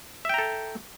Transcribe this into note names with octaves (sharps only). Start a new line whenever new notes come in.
A4 E5 G5 A#5